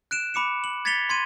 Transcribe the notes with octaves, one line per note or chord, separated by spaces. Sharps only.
F#6 D7 E7
B5 D6 C#7 E7
F#7
G#6 A6 B6 C#7 F7 G7
C6 G#6 D#7